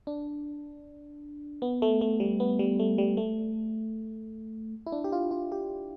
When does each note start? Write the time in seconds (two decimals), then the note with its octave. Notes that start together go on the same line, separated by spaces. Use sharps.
0.07 D4
1.62 B3
1.82 A3
2.01 A3
2.20 G3
2.40 B3
2.59 G3
2.79 A3
2.98 G3
3.17 A3
4.86 E4
4.92 D4
5.04 G4
5.12 F4
5.31 F4
5.52 G4